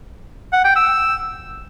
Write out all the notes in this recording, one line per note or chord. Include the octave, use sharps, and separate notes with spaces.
F#5
G5
E6